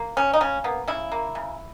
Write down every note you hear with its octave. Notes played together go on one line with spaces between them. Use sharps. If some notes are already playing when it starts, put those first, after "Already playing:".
Already playing: A#3
C#3 C#4
D#4
C#3 C#4
A#3 B3
C#3 E4
A#3
C#3